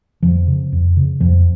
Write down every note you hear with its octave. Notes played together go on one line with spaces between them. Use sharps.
F2 F3
C#3
F2
C#3
F2 F3